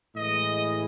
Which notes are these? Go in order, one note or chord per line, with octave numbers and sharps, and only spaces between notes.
A2 E3 G#3 D#5